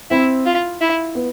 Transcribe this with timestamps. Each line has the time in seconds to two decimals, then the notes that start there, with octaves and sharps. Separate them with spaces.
0.11 C4 E4
0.46 F4
0.81 E4
1.15 B3